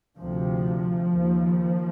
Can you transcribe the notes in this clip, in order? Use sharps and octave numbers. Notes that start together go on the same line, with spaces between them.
D2 C3 F3
D#2